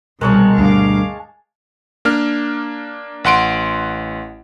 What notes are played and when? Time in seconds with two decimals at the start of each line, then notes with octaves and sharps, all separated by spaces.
0.21 C2 B2 D#3 G#3 A#4 C#5 A5
0.58 D2 G2 F5 D6
2.05 A#3 D4 F6
3.24 A1 F#5 C6 D7